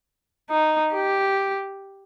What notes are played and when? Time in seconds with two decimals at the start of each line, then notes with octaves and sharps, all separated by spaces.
0.50 D#4
0.93 G4